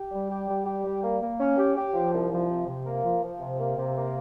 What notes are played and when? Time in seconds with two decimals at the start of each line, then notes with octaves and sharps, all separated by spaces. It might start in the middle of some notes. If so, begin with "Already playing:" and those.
Already playing: G4
0.11 G3
0.29 G4
0.48 G3
0.65 G4
0.84 G3
1.03 A#3
1.20 A#3
1.38 C#4
1.57 G4
1.75 G4
1.94 F3
2.12 C2
2.31 F3
2.48 C3
2.67 C3
2.85 A#3
3.04 F3
3.22 F3
3.40 C3
3.59 A#3
3.76 C3
3.95 A#3